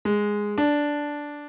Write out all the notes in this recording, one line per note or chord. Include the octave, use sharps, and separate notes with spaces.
G#3
D4